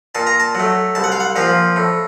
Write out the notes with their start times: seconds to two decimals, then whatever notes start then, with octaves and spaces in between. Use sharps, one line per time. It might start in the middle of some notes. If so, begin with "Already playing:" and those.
0.15 A#2 A5
0.27 A#5
0.40 A5
0.55 F#3 A3
0.95 C2 A5
1.04 F#5
1.12 F5
1.20 F#5
1.36 A#2 F3 F5
1.76 A2